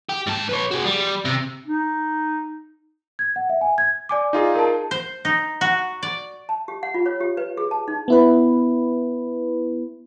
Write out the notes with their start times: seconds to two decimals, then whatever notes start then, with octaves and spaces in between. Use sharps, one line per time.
0.09 G4
0.27 G#2 A5
0.49 B4 C#5
0.71 F#4 G#4
0.85 G3
1.25 C3
1.66 D#4
3.19 G#6
3.36 F#5
3.49 E5
3.61 G#5
3.78 G#6
4.09 D5 G#5 D6
4.33 D#4 F4 G#4
4.55 A#4 A5
4.91 C5
5.25 D#4
5.61 F#4
6.03 D5
6.49 A5
6.68 G4
6.83 F#5
6.94 F4
7.06 C#5
7.20 G4
7.37 B4
7.57 G#4
7.71 A5
7.88 D#4
8.08 B3 E4 B4